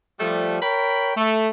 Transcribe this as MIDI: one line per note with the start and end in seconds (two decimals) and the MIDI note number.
0.20 0.57 53
0.20 0.57 55
0.20 0.57 57
0.61 1.13 70
0.61 1.13 73
0.61 1.13 79
0.61 1.13 83
1.17 1.49 57